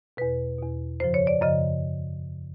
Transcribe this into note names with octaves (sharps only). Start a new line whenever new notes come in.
E2 B2 B4
E2 B2
F#2 C#3 F3 C5
C#5
D5
F#2 C#3 F3 D#5